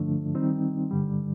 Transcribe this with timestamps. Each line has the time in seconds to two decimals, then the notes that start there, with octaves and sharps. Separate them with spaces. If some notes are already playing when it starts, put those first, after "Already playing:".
Already playing: G2 D3 F3 A3 D4
0.34 D#3 G3 C4 D#4
0.91 G2 D3 G3